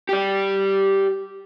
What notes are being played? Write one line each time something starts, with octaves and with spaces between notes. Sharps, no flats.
G4 D5